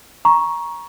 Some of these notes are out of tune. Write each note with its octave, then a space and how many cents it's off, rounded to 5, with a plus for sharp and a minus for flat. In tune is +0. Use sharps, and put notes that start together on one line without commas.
A#5 +15 C#6 +0